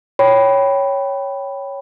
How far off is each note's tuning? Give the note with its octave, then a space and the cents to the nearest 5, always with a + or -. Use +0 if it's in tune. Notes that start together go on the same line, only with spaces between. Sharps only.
C#5 +0 G5 +0 B5 +0